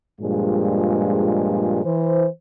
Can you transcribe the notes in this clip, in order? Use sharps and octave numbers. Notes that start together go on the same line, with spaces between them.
G2 A#2 F3 G#3
E3 C5